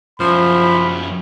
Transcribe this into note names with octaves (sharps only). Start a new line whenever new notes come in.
F#2 F3 E4 B5